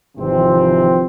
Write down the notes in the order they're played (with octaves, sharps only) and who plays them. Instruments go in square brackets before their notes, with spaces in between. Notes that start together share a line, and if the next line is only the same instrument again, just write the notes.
[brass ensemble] G#1 C3 E3 F3 C4